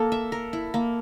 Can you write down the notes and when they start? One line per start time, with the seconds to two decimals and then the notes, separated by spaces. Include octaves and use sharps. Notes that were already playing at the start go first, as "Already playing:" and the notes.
Already playing: A#3 A4
0.12 E5
0.32 A#4
0.53 E4
0.74 A#3